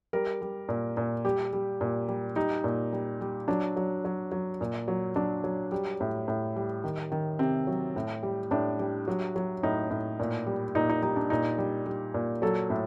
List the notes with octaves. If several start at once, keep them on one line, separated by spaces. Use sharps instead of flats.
G3 A#4
G3
A#2
A#2
G3 G4
G3
A#2
G3
G3 D#4
A#2
G3
G3
F#3 D4
F#3
F#3
F#3
A#2
F#3
F#3 D4
F#3
G3
A2
A2
G3
D#3
D#3
C3 C4
F#3
A2
G3
A2 D4
G3
F#3
F#3
A2 D#4
A2
A#2
G3
A#2 D#4
D#4
G3 D#4
D4
A#2 D#4
G3
G3
A#2
F#3 A4
A2